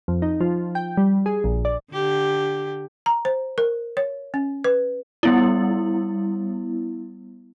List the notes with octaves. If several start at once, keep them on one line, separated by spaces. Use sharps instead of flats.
F2
D#4
F3
G5
G3
G#4
A#1
D5
D3 G4
A#5
C5
A#4
C#5
C#4
B4
G3 B3 E4